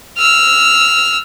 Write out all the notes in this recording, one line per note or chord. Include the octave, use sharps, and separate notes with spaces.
E6 F6